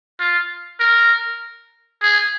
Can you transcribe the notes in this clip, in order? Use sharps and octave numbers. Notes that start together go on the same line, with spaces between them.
F4
A#4
G#4